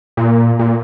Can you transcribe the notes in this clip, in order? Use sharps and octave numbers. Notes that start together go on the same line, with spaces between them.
A#2
A#2